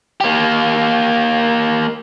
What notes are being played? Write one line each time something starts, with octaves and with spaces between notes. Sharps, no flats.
A#3 G4